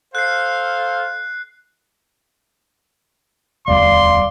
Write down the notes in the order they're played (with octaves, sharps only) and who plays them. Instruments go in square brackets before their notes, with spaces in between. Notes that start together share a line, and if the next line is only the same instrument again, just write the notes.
[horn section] A4 C5 F5 [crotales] F#6 C7
[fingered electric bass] D1 E2 G3 [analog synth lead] D5 [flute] F5 [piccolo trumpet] C6